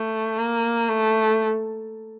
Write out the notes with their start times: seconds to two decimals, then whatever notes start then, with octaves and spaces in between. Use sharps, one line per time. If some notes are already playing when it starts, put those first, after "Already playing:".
Already playing: A3
0.39 A#3
0.89 A3